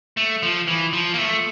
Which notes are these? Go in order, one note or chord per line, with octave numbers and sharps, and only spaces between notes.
A3
F3
E3
F3
A#3
A3